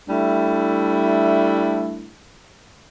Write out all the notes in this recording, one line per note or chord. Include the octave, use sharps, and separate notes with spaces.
G3 A3 D4 E4